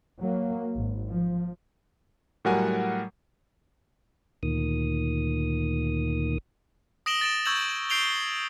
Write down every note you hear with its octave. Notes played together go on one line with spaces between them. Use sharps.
F#3 A#3
G#1
F3
A2 F#3 G3 A#4 F#5 G#5
D2 A#2 D#3 D#6
D#6 A#6 D7 E7 F#7 G7
A6 D7 E7
C#6 E6 G6 G#6 E7 F#7
G6 C7 D7 F7 G7